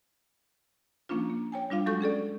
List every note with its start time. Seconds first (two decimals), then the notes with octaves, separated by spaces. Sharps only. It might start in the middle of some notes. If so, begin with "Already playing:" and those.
1.09 F3 A#3 C#4 D4 F4
1.30 A#3
1.52 C#5 G5 G#5
1.70 G3 D4 F4 F5
1.86 F#3 G#3 F#4 A4 C#6 G6
2.01 C#4 G#4 A4 D5